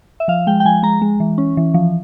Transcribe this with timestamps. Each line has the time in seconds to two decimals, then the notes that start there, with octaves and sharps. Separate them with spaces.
0.20 E5
0.28 F3 F5
0.47 G#3 G5
0.60 G5
0.65 F3 G#5
0.83 G#3 A#5
1.02 G#3
1.20 E3
1.38 C#4
1.57 E3
1.74 F3